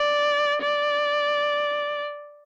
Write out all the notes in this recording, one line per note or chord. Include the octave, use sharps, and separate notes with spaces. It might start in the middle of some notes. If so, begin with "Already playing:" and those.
Already playing: D5
D5